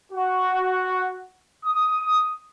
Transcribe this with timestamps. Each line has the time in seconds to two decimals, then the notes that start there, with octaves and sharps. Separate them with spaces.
0.12 F#4
1.65 D#6